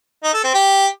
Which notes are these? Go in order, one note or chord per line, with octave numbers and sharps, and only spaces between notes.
D#4
A4
C4
G4